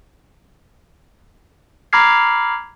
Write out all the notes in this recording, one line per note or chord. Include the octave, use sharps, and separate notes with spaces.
A#5 B5 D6 F6 G#6 C7